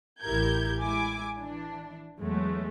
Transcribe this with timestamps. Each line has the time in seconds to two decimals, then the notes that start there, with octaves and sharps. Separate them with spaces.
0.22 A1 E4 G4 A#4 G6 G#6
0.81 G#3 E4 G#5 D6
1.39 E3 D4
2.18 E2 F#3 G#3 A3